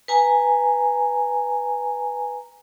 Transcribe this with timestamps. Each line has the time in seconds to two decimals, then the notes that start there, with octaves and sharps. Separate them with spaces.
0.08 B4 G#5 A#5